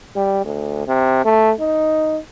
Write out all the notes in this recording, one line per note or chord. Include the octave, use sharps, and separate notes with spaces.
G3
D2
C3
A3
D#4